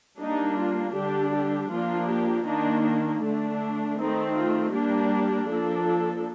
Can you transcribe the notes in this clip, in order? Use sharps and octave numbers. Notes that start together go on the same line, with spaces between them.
G3 A#3 D4 D#4
F4
D3 G3 D4 G4
G4
F3 A#3 D4 F4
G4
D#3 A#3 D4 D#4
D4
D3 A3 D4
D#3 A3 C4 D#4
F4
G3 A#3 D4 G4
F3 A#3 D4 A4